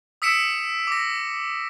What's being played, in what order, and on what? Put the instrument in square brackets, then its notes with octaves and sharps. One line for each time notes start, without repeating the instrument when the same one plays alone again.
[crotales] D#6 E6 B6 C#7 D7 E7
D6 A#6